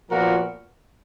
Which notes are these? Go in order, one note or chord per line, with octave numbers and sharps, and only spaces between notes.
A#2 F3 B3 F#4 A#4